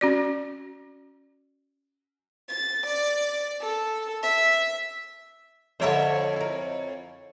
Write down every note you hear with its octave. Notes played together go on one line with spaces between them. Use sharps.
C#4 F#4 D5
A6
D5
A4
E5
F2 D3 A#4 C5 C#5 E5
E4 A#4